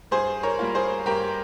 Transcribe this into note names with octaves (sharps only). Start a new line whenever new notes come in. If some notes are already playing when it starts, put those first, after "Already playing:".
G2 G#4 C5
A#4 C#5
G3 A#3 F4
G#4 C5
G2 G4 A#4